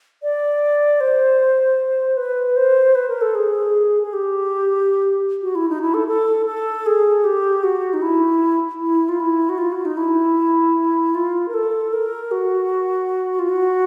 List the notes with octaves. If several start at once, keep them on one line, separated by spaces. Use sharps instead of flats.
D5
C5
B4
C5
B4
A#4
A4
G#4
G#4
G4
F#4
E4
D#4
E4
A4
A4
A4
G#4
G4
F#4
D#4
E4
E4
F4
E4
F#4
F4
F#4
D#4
E4
F4
A#4
A4
A#4
F#4
F4
F#4